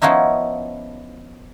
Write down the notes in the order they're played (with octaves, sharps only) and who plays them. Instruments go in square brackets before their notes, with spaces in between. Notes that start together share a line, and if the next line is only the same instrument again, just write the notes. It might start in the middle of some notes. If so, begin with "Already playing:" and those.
[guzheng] F3 B3 C#4 D#4 E4